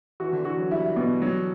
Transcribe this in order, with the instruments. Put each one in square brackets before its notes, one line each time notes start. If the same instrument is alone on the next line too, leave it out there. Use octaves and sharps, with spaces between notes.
[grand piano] E3 [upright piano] F#4
[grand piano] D3
[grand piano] E3 [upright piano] F#4
[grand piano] F#3
[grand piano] G3 [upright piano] E4
[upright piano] B2
F#3